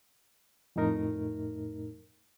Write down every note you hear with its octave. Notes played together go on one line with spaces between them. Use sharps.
F2 A2 A3 D#4 A#4